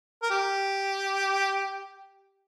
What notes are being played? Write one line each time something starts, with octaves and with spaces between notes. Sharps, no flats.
A#4
G4